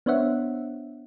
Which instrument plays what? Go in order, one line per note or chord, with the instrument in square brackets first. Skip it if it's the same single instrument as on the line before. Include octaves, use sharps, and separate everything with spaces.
[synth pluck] B3 D4 C5 C#5 E5 F#5